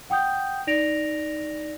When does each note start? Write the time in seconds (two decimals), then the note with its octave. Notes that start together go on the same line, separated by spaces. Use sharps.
0.10 F#5 G5 D#6 G6
0.67 D#4 D5 A#6 D7 F7